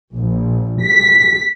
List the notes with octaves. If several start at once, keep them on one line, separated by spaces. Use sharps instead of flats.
A#1
B6